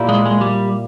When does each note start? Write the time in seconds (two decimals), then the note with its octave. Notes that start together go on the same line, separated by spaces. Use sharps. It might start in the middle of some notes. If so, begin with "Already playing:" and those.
Already playing: A#2 A#3 E4 G4
0.09 G#3
0.25 G#3
0.41 G3